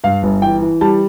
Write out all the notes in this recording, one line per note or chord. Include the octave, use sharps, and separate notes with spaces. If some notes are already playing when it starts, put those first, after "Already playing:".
G2 F5
G1
E3 G5
E3
G3 A5